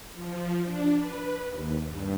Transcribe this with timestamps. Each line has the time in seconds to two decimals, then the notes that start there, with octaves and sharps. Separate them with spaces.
0.15 F3
0.64 D4
0.98 B4
1.47 D#2
1.86 G2